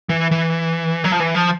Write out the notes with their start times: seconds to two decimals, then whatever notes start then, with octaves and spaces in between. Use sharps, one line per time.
0.09 E3
0.31 E3
1.04 F#3
1.12 F3
1.20 E3
1.35 F3